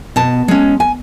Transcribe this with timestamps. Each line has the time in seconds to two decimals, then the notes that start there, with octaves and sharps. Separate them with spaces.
0.16 B2 A5
0.48 G#3 C#4
0.80 G#5